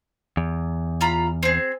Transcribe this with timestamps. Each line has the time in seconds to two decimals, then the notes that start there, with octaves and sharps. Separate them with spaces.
0.37 E2
1.01 F4 A#5 B5
1.43 C4 G#4